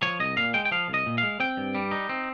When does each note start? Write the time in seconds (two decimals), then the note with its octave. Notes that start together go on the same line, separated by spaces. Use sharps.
0.02 F3 C#5
0.20 C2 D#5
0.37 A#2 F5
0.54 G#3 G5
0.65 G5
0.72 F3 F5
0.88 C2
0.94 D#5
1.06 A#2
1.18 F5
1.23 G#3
1.40 C4 G5
1.57 G2
1.75 G3
1.91 D#4
2.09 C4